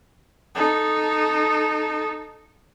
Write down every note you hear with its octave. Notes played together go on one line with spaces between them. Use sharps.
D#4 A4